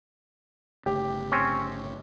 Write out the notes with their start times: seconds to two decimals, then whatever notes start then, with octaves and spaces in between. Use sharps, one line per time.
0.86 G1 C#3 A3 G4
1.32 C4 C#4